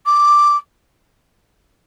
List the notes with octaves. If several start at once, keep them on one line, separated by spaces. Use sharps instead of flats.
D6